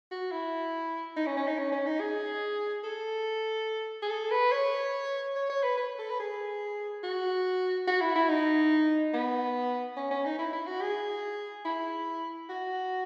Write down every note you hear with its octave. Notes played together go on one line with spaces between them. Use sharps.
F#4
E4
D#4
C#4
C#4
D#4
C#4
C#4
D#4
G#4
A4
G#4
A4
B4
C#5
C#5
C#5
B4
B4
A4
B4
G#4
F#4
F#4
E4
E4
D#4
B3
C#4
C#4
D#4
E4
E4
F#4
G#4
E4
F#4